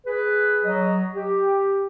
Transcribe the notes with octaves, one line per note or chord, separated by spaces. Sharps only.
G#4 B4
F#3 D#5
G4